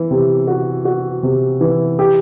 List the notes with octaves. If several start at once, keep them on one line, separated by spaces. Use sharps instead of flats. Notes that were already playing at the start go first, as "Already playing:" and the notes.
Already playing: E3
C3
F#4
F#4
C3
E3
G4